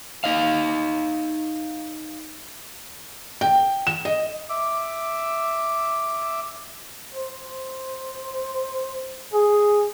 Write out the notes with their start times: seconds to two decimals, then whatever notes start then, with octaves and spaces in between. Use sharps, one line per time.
0.24 D#4 D#5 F5
3.41 G5
3.87 E7
4.05 D#5
4.49 E5 D6
7.14 C5
9.34 G#4